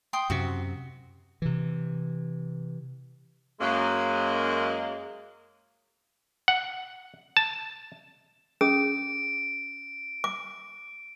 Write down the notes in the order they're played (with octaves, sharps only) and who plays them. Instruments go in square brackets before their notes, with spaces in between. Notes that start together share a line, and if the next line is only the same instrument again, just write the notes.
[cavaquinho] G5 C6 D#6
[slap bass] F#2 C3 [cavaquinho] F#4
[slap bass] C3 E3
[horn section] F#2 G#3 A#3
[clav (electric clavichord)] F#5
A5
[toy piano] C#4 G#4 D#6 [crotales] D7
[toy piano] D6